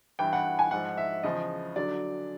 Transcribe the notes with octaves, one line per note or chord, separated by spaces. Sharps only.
G2 E3 G5
F#5
G#5
G#2 F3 F#5
E5
E2 C#3 F3 D#5
D3 F#3 D5